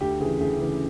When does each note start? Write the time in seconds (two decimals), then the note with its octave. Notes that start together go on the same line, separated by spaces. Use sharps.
0.01 D2 G4
0.20 C#3 E3 G#4
0.40 D2 G#4
0.59 C#3 E3